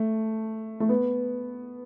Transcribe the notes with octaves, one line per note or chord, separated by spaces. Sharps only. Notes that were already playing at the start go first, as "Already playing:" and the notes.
Already playing: A3
A3
B3